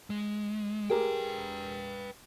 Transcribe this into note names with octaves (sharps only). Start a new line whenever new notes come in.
G#3
G4 G#4 A#4 B4 G5